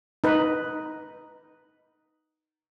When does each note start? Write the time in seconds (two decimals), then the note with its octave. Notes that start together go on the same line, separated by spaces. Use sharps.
0.24 D#4 B4